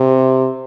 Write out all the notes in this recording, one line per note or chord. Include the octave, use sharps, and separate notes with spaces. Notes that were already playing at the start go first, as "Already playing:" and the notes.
Already playing: C3